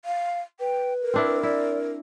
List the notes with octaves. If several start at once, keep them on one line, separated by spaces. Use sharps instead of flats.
F5
B4 G5
A#4
C4 D4 E4
E4 D5